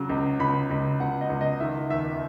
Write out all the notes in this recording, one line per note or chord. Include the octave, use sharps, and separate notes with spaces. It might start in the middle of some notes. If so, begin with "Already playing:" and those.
Already playing: C#3 F#3
C#2
C#2 B5
C#2
C#2 F#5
D#5
C#2
D#5
D#3 E5
D#2 E5